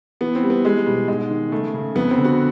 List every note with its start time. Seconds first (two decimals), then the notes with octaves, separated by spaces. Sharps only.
0.21 E3 B3
0.35 C4
0.43 G3
0.50 B3
0.64 G3 G#3
0.86 B2 G3
1.08 G#2 G#3
1.30 D#3
1.52 C#3 A3
1.74 C#3
1.95 F2 B3
2.10 C4
2.18 D3
2.24 F#4